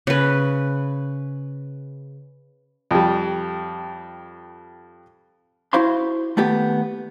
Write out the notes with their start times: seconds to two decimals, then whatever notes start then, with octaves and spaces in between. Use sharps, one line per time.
0.07 C#3 B4
2.91 F2 G3
5.73 E4 F#4 C5 F5 B5 C6
6.37 D#2 A3 B3 G4